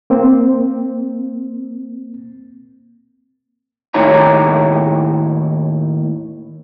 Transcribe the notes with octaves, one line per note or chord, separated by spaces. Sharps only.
A#3 C4
D#2 A2 D#4 E4 C#5 A#5